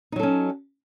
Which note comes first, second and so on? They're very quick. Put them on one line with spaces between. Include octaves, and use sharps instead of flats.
D#4 F#3 A4 C#4